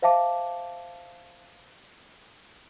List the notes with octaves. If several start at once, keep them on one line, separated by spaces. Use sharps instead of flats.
C5 E5 F5 A5 D6